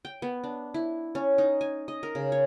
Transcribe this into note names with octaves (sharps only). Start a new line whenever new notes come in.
G5
B3
D4
E4
C#4
D#4
G#5
D#5
A#4
C#3
C#5